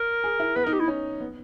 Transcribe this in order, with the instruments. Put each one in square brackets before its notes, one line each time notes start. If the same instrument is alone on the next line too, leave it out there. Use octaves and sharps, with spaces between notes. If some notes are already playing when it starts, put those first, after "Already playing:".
Already playing: [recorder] A#4
[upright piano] G#4
E4
[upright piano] B3 [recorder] B4
[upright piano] D#4 [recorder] A#4
[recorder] G4
E4
[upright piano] C#4
B3